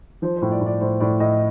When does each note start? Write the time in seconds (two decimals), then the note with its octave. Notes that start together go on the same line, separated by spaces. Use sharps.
0.22 F3 C5
0.37 C5
0.42 A2
0.51 D5
0.61 A2
0.66 D5
0.81 A2 C5
1.00 A2 D5
1.20 A2 D#5